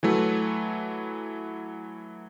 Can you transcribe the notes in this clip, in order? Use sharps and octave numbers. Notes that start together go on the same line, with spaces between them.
E3 F#3 A3